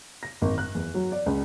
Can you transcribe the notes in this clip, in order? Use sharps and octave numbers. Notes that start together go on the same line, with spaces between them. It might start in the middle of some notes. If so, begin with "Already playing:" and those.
A#6
G#1
F#6
E2
F#3
D5
C#2